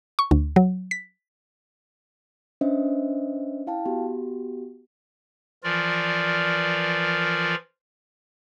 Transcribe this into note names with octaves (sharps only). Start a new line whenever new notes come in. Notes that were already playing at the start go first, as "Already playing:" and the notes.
C#6
D2
F#3
B6
C#4 D4 B4 C5 D#5 E5
E4 F5 G5 A5
B3 F#4 G4
E3 F3 F4 A#4 D5